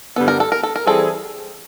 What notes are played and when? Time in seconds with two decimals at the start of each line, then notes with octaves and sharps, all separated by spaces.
0.16 G2 D3 G3 B3 A4
0.28 A#4
0.40 A4
0.52 A#4
0.63 A4
0.76 A#4
0.85 E3 G3 C4 E4 G#4 A4